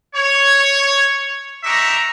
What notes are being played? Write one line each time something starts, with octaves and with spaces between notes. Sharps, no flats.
C#5
D4 D#4 G4 E5 A#5 C#6